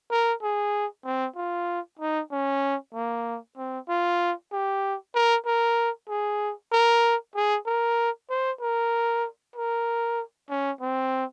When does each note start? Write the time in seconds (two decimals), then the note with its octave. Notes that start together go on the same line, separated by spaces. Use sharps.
0.11 A#4
0.42 G#4
1.05 C4
1.36 F4
1.99 D#4
2.32 C#4
2.94 A#3
3.57 C4
3.89 F4
4.52 G4
5.15 A#4
5.46 A#4
6.09 G#4
6.72 A#4
7.35 G#4
7.66 A#4
8.30 C5
8.61 A#4
9.56 A#4
10.49 C#4
10.81 C4